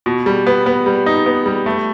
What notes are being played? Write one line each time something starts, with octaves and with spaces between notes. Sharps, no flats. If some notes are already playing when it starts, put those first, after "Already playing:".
B2
G3
B3
B3
G3
D#4
B3
G3
A3